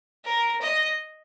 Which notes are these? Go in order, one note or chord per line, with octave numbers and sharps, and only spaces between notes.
A#4
D#5